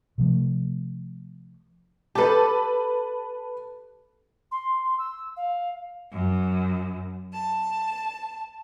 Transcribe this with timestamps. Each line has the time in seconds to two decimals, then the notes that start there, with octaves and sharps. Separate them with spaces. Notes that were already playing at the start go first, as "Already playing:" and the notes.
0.18 C3 F3 A3
2.15 G4 A4 B4 A5
4.51 C6
4.98 E6
5.36 F5
6.11 F#2
7.32 A5